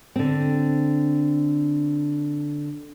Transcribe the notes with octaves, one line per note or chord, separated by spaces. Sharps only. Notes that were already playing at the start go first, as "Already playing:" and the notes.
D3 C4